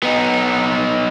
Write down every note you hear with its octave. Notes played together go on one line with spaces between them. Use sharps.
B3 D#4